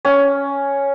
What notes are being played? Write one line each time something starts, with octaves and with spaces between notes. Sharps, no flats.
C#4